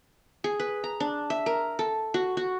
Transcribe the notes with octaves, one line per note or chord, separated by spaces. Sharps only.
G#4
B4
A#5
D4
E5
A#4
A4
F#4
F#4